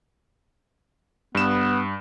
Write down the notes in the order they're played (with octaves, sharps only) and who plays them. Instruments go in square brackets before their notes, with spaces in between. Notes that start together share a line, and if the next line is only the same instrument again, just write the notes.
[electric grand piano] G2 E7 [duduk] B3